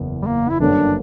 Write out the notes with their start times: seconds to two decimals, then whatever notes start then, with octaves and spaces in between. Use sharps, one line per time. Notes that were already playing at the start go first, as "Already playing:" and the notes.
Already playing: F#1 E2 C#3
0.22 G3
0.27 A#3
0.50 E4
0.59 G1 F#2 D3 A#3 C#4 D4